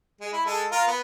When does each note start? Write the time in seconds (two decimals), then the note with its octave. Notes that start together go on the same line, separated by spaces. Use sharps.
0.20 G#3
0.33 E4
0.46 G#3 A4
0.71 F4 A#4
0.88 B3